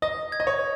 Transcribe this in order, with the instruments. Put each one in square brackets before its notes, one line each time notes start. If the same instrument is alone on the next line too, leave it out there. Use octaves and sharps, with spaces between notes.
[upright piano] D#5 [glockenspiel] D#6
[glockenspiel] G#6
[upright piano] D#5
C#5